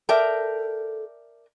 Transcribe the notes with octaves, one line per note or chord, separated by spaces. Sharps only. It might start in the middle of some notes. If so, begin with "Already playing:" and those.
A4 A#4 D5 E5 G5 A5